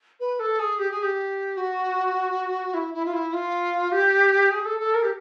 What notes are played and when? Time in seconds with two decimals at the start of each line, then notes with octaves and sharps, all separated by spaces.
0.20 B4
0.39 A4
0.59 G#4
0.79 G4
0.91 G#4
1.02 G4
1.57 F#4
2.74 E4
2.94 E4
3.05 F4
3.13 E4
3.33 F4
3.92 G4
4.50 G#4
4.65 A4
4.79 A4
4.94 A#4
5.03 G4